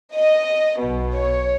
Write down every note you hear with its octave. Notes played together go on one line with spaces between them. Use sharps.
D#5
B1 B2
C#5